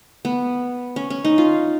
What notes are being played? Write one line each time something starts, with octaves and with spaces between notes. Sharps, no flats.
B3
C#4
C#4
D#4
F4